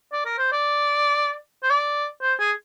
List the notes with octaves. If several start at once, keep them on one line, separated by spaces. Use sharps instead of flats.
D5
A#4
C5
D5
C5
D5
C5
G#4